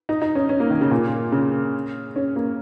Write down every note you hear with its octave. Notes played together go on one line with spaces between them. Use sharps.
D#4
D#4
C#4
C#4
A#3
D#3
C#3
A#2
C#3
C#4
A#3